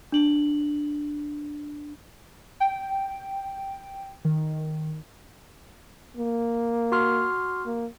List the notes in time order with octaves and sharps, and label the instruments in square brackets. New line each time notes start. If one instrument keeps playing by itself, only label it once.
[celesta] D4 F#7
[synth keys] G5
D#3
[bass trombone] A#3
[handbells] F#4 C6 F6
[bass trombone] A#3